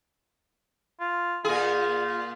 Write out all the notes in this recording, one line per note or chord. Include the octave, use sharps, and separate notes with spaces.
F4
A#2 F4 G#4